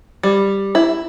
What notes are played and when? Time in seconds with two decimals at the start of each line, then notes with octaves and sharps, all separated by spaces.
0.23 G3
0.75 E4